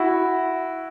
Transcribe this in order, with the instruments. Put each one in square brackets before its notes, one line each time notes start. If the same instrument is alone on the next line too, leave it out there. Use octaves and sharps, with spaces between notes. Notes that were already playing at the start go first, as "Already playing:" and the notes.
Already playing: [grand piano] E4 F#4